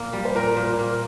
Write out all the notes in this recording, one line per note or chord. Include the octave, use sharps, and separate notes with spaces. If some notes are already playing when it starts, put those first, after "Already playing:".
Already playing: A#2 A#3
G3
C5
A#2 A#4
A#2
A#3